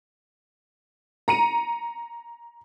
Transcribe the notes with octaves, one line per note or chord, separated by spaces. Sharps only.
A#5 C#7 D#7